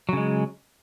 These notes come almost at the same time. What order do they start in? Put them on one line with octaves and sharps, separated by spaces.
F#3 C#3 G#3